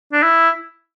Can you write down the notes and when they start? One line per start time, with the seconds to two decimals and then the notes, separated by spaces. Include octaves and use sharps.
0.13 D4
0.23 E4